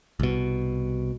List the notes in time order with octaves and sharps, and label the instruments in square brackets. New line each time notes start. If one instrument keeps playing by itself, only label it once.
[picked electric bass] C2 B2